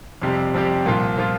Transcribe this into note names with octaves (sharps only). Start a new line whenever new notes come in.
F2 C3 G3 C4 G4
F2 C3 G3 C4 G4
C2 A#2 F3 A#3 F4
A#2 F3 A#3 F4